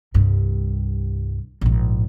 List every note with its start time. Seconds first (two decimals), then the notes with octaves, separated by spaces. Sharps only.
0.14 C2 G2
1.61 A#1 G#2